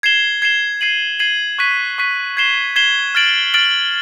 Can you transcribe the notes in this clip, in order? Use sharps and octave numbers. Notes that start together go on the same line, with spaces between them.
G#6 C7 E7 G7
G#6 C7 E7 G7
G#6 C7 D#7 F#7
G#6 C7 D#7 F#7
C#6 F#6 B6 D#7
C#6 F#6 B6 D#7
G#6 C7 E7 G7
G#6 C7 E7 G7
F6 A6 D7 F#7
F6 A6 D7 F#7